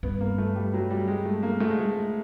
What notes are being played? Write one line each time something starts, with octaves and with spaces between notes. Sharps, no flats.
G2 B3
A#3
A3
G3
F#3
G3
G#3
A3
A#3
G#2 A3
G#3
A3